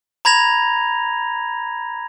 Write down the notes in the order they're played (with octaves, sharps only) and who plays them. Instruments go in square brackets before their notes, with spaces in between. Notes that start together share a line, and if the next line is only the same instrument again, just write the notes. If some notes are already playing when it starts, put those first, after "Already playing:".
[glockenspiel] A#5 B5 G#6 A#6 F7